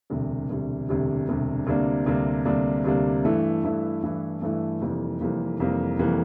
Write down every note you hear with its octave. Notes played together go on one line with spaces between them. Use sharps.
E1 D2 C3 G3
E1 D2 C3 G3
E1 D2 C3 G3
E1 D2 C3 G3
D2 C3 G3 A#3 D4
D2 C3 G3 A#3 D4
D2 C3 G3 A#3 D4
D2 C3 G3 A#3 D4
G2 E3 A3 E4
G2 E3 A3 E4
G2 E3 A3 E4
G2 E3 A3 E4
F1 F2 E3 G3 A#3
F1 F2 E3 G3 A#3
F1 F2 E3 G3 A#3
F1 F2 E3 G3 A#3